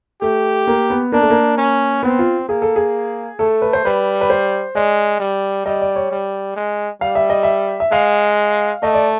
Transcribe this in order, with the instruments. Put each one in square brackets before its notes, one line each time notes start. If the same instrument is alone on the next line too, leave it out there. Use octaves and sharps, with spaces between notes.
[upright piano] A3 [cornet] G4
[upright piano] A#3
B3
[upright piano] A#3 [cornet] D4
[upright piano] A3
A#3
[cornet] C#4
[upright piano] B3 [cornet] C4
[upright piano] F4
[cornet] A#3 [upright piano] G#4
[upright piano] A4
G#4
[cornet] A3 [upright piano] A4
[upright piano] B4
C5
[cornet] G3 [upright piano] B4
[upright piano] B4
C5
[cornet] G#3 [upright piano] D5
[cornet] G3
[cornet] G3 [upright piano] D#5
[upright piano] D5
C#5
[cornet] G3
G#3
[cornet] G3 [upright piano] F5
[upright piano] E5
D#5
E5
E5
[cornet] G#3 [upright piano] F5
[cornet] A3 [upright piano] D#5
[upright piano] D5